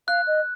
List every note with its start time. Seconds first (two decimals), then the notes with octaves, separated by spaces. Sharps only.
0.08 F5 F#6
0.27 D#5